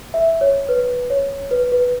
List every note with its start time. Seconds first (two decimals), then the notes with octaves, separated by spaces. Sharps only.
0.14 E5
0.41 C#5
0.69 B4
1.10 C#5
1.51 B4
1.72 B4